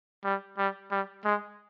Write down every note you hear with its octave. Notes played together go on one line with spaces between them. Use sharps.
G3
G3
G3
G#3